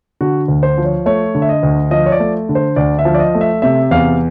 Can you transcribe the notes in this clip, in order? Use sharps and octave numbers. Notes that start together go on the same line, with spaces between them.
D3 F#4
D2
C5
F3
C#5
A3 C#5
D3
E5
D#5
D2
F3 D#5
C#5
D5
A3
D3
C5
D2 D5
E5
F3
D5
D#5
A3
E5
C3 E5
E2 F5